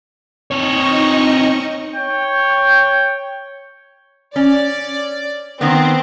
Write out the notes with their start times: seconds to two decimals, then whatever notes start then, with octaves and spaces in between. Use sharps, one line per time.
0.51 C4 D#4 C#5 D#5 C#6
1.94 C#5 G5
4.36 C#4 D5
5.61 D#3 B3 C4